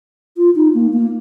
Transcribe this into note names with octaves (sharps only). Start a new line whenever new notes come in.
F4
D#4
A#3
A#3